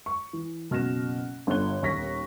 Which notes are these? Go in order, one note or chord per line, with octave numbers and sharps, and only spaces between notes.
C#6
E3
F#1 B2 F6 F#6 A#6 E7
G1 D3 F4 F#6 G7
D#1 D#2 C#6 A#6 B6